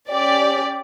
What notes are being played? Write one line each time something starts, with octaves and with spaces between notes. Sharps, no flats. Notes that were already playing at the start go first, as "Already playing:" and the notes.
C#4 G4 D5